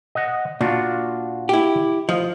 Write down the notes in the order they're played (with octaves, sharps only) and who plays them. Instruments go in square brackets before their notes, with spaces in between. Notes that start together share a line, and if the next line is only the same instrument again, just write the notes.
[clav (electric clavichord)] D#5 F#5
[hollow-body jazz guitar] A#2 [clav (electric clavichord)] D4 F4 F#4
[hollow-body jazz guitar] E4 G4
[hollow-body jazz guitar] F3 [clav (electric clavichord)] D#5